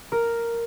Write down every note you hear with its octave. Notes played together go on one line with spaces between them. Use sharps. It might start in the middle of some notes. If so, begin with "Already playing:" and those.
A#4